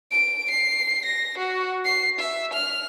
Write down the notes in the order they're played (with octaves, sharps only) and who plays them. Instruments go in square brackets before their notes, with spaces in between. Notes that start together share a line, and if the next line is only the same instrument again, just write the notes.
[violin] D7
C7
A#6
F#4
C7
E5
F6